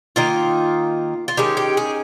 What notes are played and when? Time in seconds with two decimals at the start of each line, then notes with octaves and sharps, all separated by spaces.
0.16 D#3 A#3 D#4 F4
1.28 F4
1.37 D#3 G#3 C#4 G4
1.57 G4
1.77 G#4